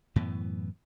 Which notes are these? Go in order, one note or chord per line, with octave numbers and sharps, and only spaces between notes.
F#2 A2 E3 B3